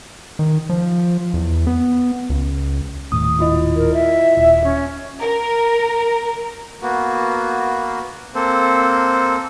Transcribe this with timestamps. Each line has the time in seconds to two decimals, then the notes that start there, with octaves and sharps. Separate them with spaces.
0.39 D#3
0.70 F3
1.34 E2
1.67 B3
2.30 C#2
3.12 D#1 D#2 A2 D#6
3.39 E4 F4 D#5
3.76 A#4
3.94 E5
4.37 D#1
4.64 C#4
5.20 A#4
6.82 A#3 B3 F#4
8.35 A#3 C4 A4 C5